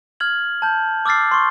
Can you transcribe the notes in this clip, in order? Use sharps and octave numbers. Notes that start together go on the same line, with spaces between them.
F6 G#6 F#7
A5 G6
D6 E6 F6 A6 C7
C6 C#6